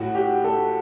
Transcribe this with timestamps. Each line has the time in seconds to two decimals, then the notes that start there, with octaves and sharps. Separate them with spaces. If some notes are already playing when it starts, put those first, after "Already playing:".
Already playing: A2 F#4
0.15 G4
0.44 A4